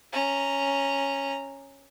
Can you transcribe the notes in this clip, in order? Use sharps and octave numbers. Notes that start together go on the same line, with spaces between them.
C#4 A#5